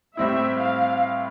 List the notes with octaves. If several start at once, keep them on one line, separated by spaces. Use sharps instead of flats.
A2 G3 C4 E4 E5
F5